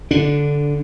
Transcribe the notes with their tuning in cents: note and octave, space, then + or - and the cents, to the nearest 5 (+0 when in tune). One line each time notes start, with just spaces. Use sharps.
D3 -15 D4 +0